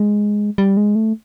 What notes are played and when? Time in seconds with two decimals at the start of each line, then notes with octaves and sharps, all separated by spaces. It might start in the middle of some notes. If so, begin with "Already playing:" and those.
Already playing: G#3
0.58 G3
0.77 G#3
0.95 A3